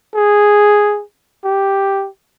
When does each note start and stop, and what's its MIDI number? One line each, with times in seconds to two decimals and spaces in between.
0.16 1.03 68
1.44 2.08 67